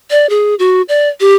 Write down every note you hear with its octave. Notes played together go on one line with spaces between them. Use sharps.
D5
G#4
F#4
D5
G4